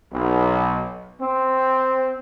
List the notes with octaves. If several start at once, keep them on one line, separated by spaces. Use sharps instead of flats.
B1
C4